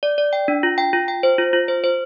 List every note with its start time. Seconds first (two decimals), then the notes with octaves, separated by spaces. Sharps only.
0.03 D5
0.18 D5
0.33 G5
0.48 D4
0.63 F4
0.78 G5
0.93 F4
1.08 G5
1.23 C5
1.38 F4
1.53 F4
1.68 C5
1.84 C5